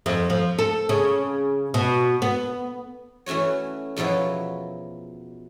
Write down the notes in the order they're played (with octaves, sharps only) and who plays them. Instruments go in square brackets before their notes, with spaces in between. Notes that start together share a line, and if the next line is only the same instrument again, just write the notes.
[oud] F2
F3
A4
C#3
B2
B3
[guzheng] E3 A3 C#4 F#4 C#5
E2 B2 F3 F#3 E4